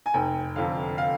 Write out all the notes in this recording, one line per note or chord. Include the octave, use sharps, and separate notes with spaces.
G#5
F1 G5
F2 D3 F5
F5